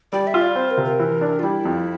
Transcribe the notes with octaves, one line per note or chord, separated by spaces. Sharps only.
G3 D5
E5
F4
D5
C4 C5
A#4
C3
A#4
E3
D4
F4
G3 E4
F2